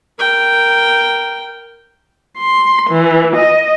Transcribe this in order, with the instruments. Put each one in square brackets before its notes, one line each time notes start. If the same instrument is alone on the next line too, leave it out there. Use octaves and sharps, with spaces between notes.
[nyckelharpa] A#4 G5
[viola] C6
E3
D#5